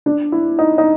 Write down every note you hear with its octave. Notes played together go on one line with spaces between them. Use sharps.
D4
E4
D#4
D#4